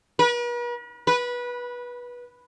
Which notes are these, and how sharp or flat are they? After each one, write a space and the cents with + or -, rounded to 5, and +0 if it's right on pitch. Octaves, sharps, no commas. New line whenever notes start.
B4 -45
B4 -20